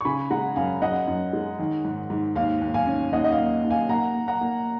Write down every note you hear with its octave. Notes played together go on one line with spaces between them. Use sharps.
C#6
C#3 G#5 B5
G#3 F#5 A#5
F#2 F5 G#5
F#2 D#5 F#5
F#2
G#3
D#3
G#2
G#2
D#2 F5
D#2
F5 G#5
C#4
D#2 D#5 F#5
D#5
F5
A#3
D#2
F5 G#5
A#3 F#5 A#5
A#3
F#5 A#5
A#3